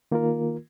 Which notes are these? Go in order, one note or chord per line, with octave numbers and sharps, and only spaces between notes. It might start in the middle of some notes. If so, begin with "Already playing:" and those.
D#3 A#3 F4 A#4